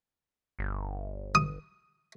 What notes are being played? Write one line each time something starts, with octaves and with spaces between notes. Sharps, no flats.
G1
D#6